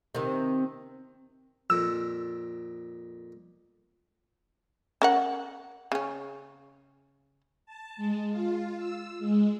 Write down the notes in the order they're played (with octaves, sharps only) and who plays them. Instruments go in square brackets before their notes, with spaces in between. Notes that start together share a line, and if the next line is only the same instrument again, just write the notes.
[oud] C3 D#3
[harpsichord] F2 A#2 [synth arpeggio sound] E6
[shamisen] C#4 A#4 F#5
C#3 C#4
[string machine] A5
G#3
F4
E6
G#3